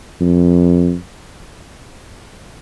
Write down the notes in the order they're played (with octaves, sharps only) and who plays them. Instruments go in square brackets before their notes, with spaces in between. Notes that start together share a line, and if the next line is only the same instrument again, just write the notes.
[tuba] F2